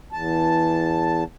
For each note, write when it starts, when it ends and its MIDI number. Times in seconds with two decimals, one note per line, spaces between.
0.12 1.24 40
0.12 1.24 81